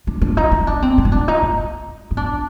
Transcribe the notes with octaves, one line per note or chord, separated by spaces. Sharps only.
D4
D4
D#4
D#4
D4
C4
C4
D#4
D4
D#4
D#4
D#4
D4